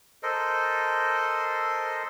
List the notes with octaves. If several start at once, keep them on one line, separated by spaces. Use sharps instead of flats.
A4 A#4 C5 D#5